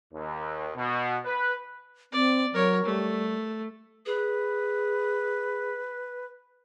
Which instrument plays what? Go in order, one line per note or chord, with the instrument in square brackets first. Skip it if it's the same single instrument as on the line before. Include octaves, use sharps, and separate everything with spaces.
[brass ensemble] D#2
B2
B4
[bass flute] C4 [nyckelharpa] D5
[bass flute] F#3 [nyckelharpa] A#4 C#5
[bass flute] G3 [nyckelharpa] A3
[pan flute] G#4 [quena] B4